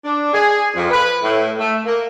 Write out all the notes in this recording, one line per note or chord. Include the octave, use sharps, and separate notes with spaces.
D4
G#4
F2
B4
A2
A3
A#3